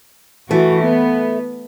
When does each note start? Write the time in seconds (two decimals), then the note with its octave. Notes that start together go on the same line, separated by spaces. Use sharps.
0.51 E3 A3 F#4
0.80 B3